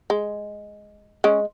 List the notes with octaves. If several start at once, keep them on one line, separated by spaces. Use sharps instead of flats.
G#3
G#3 C#4